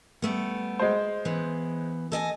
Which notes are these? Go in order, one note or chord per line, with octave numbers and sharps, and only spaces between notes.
G3 A3 B3
G#3 C5
E3 B3
A4 D#5 G#5